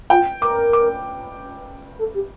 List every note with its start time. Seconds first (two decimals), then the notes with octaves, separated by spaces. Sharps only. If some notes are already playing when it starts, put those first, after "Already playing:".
0.10 F4 G5
0.41 A#4 D6
0.73 D6
1.99 A4
2.15 G4